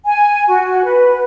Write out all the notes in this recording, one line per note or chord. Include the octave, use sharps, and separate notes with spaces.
G#5
F#4
B4